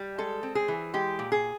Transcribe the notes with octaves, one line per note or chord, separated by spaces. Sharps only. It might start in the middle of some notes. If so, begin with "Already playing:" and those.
Already playing: G3
G#3 A4
C4
G#4
E3
G#3 G4
A#2
G#4